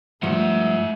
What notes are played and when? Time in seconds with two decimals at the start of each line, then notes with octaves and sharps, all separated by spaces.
0.23 G2 F3 G#3 A3 E5 F#5